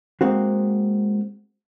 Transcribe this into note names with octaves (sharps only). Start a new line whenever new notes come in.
G#3 A#3 C4 F#4